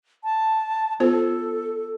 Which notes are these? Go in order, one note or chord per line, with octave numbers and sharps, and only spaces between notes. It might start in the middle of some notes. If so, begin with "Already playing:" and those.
A5
B3 F4 A4 C5